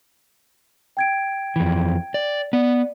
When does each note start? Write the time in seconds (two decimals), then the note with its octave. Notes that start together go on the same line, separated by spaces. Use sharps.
0.97 G5 G#6 D7
1.56 F2 E3
2.14 D5
2.53 B3 D5